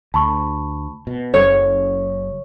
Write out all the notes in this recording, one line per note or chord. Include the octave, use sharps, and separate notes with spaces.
D2 A5 B5 C#6
B2
F#1 F#2 A4 C#5